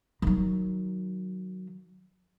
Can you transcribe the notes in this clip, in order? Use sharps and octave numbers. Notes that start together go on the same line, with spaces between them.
D#3 F#3